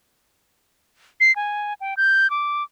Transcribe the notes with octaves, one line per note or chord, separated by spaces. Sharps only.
C7
G#5
G5
G6
D6